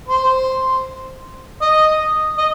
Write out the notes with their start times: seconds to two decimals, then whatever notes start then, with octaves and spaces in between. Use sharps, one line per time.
0.08 C5
1.62 D#5
2.38 D#5